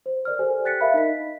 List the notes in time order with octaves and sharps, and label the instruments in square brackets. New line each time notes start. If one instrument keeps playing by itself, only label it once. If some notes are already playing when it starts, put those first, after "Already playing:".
[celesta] C5
A#4 D5 F6
G4 A4 C5 G#5
G5 F#6 A6 B6 C#7
A#4 E5 F5 B5
D#4 D#5 B6